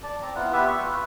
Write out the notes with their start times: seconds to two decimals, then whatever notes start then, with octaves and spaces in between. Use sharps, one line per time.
0.03 D5 A5
0.22 C4 A#5
0.35 B3 E4 F4 F#5
0.53 B3 G4 B4 E5
0.68 C#6
0.85 F4 B4